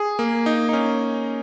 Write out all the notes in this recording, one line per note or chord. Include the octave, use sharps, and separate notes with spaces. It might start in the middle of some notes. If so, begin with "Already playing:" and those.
Already playing: G#4
A#3
D#4
D#4
C#4